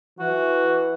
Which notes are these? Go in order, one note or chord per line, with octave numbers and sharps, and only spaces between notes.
E3 F#4